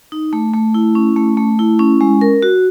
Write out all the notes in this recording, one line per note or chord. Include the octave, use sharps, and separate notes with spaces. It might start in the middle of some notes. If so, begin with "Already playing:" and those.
D#4
A3
A3
E4
C#4
A3
A3
E4
C#4
G#3
A#4
F#4